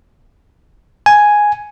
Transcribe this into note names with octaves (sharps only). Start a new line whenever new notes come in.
G#5